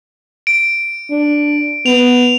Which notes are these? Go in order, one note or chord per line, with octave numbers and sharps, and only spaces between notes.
D7
D4
B3 F7